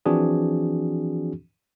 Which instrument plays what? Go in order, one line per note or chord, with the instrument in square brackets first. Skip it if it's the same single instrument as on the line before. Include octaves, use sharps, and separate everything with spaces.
[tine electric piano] E3 F3 C4 D4 F#4 G#4